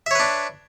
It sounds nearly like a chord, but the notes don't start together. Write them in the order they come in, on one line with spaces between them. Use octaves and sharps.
E5 C#5 B4 D4